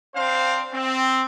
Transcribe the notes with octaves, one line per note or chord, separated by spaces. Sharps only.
C4 D4 C5 F5
C4